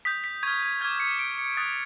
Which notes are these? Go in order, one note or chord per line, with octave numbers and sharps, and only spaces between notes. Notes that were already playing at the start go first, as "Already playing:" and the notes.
D#6 G6 B6
B6
C#6 F6 G#6
G#6
D6 F6 G#6
C#7
D6 G6 D7
C#7
D#6 F#6 A6